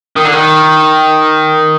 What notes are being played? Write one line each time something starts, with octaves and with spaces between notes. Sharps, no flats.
D#3
D3
D#3